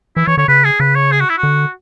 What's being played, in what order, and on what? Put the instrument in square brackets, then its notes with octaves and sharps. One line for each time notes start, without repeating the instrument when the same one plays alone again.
[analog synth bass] E3 [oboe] E4
[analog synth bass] E3 [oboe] C#5
[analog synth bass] D3 [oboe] C#5
[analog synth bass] C#3 [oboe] B4
[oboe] G#4
[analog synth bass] C#3 [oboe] B4
[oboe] C#5
G#4
F#4
E4
F#4
[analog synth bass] D3